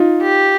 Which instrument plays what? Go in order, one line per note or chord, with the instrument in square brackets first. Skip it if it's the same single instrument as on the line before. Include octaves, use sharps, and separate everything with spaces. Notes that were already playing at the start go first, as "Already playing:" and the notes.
Already playing: [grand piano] D#4 F4
[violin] G4